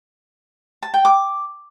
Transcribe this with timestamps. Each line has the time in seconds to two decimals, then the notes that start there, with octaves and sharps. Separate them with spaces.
0.83 A5
0.94 G5
1.05 D6